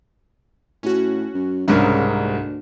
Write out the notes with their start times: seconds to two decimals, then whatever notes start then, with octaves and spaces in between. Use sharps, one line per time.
0.83 A2 C#4 F#4
1.34 F#2
1.68 C2 G#2 C#3 D4 A#4
2.21 D2